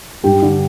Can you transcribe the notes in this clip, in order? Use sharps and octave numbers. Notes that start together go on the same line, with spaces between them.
G2 G4 G5
D3